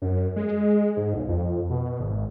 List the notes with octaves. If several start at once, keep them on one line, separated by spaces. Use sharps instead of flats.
F#2
G#3
G#2
B1
F2
B2
G#1